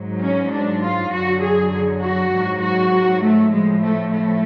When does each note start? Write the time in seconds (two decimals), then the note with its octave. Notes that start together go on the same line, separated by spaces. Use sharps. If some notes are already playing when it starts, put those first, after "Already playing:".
Already playing: G#2 F#3
0.20 C#4
0.49 D4
0.80 F4
1.10 F#2 D3 F#3 F#4
1.40 G#4
2.01 F#4
2.32 G#2 F#3
2.62 F#4
3.23 A3
3.52 A2 F3 G#3
3.83 A3
4.13 A3